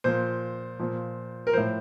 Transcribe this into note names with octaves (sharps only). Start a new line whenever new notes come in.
A#2 F3 C5
A#2 F3
A#4
A2 F3 C5